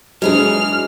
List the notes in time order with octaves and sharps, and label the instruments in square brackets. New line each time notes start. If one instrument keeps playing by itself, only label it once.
[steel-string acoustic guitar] G#2 E3 G#4 [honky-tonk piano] F#3 G#3 D4 [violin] F6